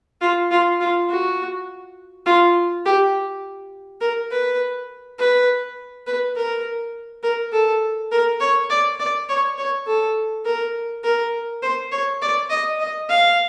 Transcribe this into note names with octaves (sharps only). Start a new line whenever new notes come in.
F4
F4
F4
F#4
F4
G4
A#4
B4
B4
B4
A#4
A#4
A4
A#4
C#5
D5
D5
C#5
C#5
A4
A#4
A#4
C5
C#5
D5
D#5
D#5
F5